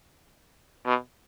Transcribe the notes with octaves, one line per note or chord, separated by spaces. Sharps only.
B2